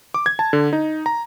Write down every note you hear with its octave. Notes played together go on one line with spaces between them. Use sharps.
D6
G#6
A5
D3
D#4
A#5